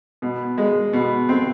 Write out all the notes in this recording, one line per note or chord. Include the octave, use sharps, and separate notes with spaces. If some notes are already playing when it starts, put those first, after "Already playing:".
B2
G#3
B2
C4